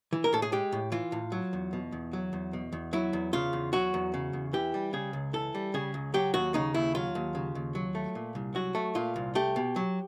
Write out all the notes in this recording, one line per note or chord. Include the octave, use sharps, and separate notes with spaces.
E3
A#4
A2 A4
G#4
G#3 G4
A2
E3 F4
A2
F#3
E2
B2
E2
F#3
E2
B2
E2
F#3 E4
E2
C#3 F4
E2
F#3 F#4
E2
C#3
E2
E3 G4
G3
C#3 G#4
C#2
E3 A4
G3
C#3 G#4
C#2
F#3 G4
D#2 F#4
C#3 D#4
D#2 E4
F#3 F4
D#2
C#3
D#2
F#3
A3
A#2
C2
F#3 F#4
A3
A#2 F4
C2
A3 G4
B2
F#3